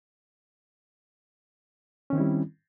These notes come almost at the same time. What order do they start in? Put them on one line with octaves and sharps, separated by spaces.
C#4 D#3 C4 E4 G3